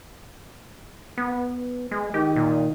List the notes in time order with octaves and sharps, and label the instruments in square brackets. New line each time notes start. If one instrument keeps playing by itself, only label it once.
[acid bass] B3
G#3
[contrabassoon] D#3 [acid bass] G4
[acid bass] A#2